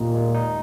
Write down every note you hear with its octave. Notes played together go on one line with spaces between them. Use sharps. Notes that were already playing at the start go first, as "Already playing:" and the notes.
Already playing: D#2 A#2 D#3 D#4
G#3
D#4